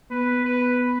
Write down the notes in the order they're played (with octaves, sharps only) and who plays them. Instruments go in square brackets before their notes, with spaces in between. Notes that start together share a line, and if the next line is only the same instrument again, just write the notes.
[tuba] B3 [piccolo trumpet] B4
[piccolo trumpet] B4